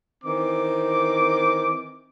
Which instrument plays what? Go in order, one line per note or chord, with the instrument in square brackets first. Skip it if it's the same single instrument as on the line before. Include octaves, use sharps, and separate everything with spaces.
[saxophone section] D#3 E3 C4 [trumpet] D6